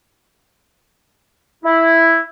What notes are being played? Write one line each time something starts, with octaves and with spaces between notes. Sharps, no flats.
E4